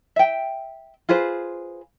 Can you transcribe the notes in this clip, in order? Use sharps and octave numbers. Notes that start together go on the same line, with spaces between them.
E5 G5
F4 G#4 B4 C5